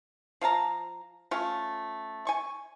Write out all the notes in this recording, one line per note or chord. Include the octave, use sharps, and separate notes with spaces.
F3 F5 A5 A#5
A3 C#4 F4
G#5 C#6